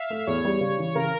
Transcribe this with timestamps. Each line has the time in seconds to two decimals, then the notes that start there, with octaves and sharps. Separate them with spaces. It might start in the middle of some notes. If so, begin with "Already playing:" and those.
Already playing: E5 F5
0.10 A3
0.27 E2 C#5
0.45 G3
0.61 C#3
0.78 E3
0.95 C#3 A#4